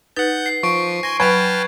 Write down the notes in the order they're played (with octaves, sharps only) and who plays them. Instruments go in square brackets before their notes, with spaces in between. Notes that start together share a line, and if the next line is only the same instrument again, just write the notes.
[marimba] D#4 B4 A6 [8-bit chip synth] F#5 G6
[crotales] C7
[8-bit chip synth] F3 [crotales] C#6 D7
[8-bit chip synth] G#5 C6 [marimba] A#6
[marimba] F#3 [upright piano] B4 [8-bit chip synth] G5 A5 F6 [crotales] G#6